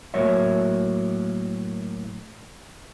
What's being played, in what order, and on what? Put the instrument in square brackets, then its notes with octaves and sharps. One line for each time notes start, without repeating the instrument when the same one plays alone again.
[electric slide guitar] A2 F#3 A#3 C#5 E5